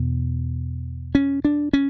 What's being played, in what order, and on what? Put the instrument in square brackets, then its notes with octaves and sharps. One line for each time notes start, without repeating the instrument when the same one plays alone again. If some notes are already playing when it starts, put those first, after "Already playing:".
Already playing: [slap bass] E2 B2
C#4
D4
C#4